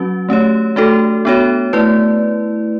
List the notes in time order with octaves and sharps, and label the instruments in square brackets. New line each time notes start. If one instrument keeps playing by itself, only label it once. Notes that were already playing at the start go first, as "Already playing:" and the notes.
Already playing: [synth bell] F#3 C#4 F#4
A3 C#4 G4 C#5
A3 D4 F#4 A4
B3 D4 F#4 C#5
A3 E4 B4 D5